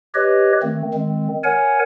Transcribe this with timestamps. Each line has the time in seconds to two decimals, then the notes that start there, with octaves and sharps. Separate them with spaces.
0.14 G4 B4 C#5 D#5
0.62 D#3 A3 C4
0.94 D#3 G#3 C4
1.44 A#4 C#5 F#5 G#5